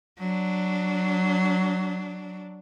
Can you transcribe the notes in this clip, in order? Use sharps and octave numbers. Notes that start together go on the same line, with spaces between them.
F#3 D4